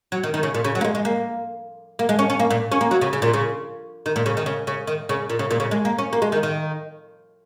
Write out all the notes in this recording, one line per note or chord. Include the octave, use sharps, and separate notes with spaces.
F#3
D#3
D#3
C#3
A#2
C#3
F#3
A#3
G#3
G#3
A#3
A#3
G#3
C#4
C#4
A#3
A#2
C#4
A#3
F#3
C#3
C#3
A#2
C#3
D#3
A#2
C#3
D#3
C#3
C#3
D#3
C#3
A#2
C#3
A#2
C#3
G#3
A#3
C#4
A#3
G#3
D#3
D#3